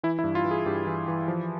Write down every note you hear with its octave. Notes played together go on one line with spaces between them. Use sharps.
E3 E4
E4
G2
F4
E3
G#4
G2 G4
E3
E3
F3